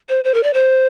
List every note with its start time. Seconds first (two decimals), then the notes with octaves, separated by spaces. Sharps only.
0.09 C5
0.24 C5
0.34 A#4
0.43 D5
0.54 C5